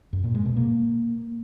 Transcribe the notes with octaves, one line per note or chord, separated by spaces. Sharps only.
F#2
A#2
G#3
B2
A#3